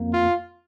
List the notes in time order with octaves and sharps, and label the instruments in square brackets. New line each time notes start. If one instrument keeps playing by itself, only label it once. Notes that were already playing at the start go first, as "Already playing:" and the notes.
Already playing: [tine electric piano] F2 A#3
[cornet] F4